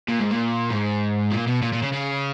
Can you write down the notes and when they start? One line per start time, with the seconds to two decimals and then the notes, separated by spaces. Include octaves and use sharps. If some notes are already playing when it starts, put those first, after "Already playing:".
0.09 A#2
0.20 G#2
0.31 A#2
0.70 G#2
1.31 A#2
1.47 B2
1.62 A#2
1.73 A#2
1.83 C#3
1.93 C#3